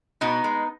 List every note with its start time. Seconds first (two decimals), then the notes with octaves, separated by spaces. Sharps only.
0.21 B2 B3 D#4
0.44 G#3